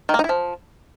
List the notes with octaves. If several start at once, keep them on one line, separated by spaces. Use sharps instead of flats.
D#3
A#3
D#4
E4
F3